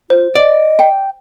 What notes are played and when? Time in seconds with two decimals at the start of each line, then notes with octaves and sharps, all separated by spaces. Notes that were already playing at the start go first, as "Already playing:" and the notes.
0.10 F4 C5
0.35 D5 D#5
0.79 G5